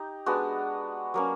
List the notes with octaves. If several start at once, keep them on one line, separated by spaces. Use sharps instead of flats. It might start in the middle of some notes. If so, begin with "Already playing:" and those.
Already playing: D#4 G4
G#3 B3 D4 F#4
F#3 A#3 C#4